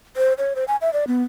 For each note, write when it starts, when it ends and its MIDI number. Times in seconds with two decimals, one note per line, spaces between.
0.17 0.33 72
0.38 0.53 73
0.56 0.64 72
0.68 0.76 80
0.81 0.92 76
0.93 1.04 74
1.08 1.23 59